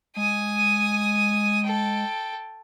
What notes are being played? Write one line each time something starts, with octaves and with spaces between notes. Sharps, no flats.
G#3 G#5 D#6
A4 G5